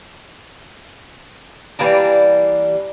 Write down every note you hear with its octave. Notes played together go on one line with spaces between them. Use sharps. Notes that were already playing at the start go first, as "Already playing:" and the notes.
E3 G3 A#3 D4